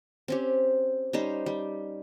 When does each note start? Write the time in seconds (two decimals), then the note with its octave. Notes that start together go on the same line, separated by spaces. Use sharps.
0.28 C4 C#4 G4
1.13 G3 C#4 D#4 C5
1.46 G3